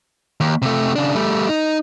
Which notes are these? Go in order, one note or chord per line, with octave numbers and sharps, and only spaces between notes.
D#2
C3 A3
C#3 D4
G3 A3
D#4